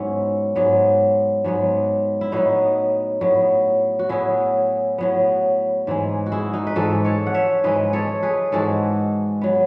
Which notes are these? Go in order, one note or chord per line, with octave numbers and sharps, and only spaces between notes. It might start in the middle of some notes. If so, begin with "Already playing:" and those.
Already playing: G#2 F#3 B3 C#4 E4
G#2 F#3 B3
G#2 F#3 B3
E4
A2 F#3 B3 D#4 F#4
A2 F#3 B3
F#4
A2 F#3 B3 E4 G#4
A2 F#3 B3
G#2 E3 G#3
F#4
E4 G#4
D#4 F#4
B4
G#2 E3 G#3 F#4 A4
A4 C#5
F#5
C#5 E5
G#2 E3 G#3 B4 D#5
A4 C#5
G#4 B4
G#2 E3 G#3 F#4 A4
F#3 B3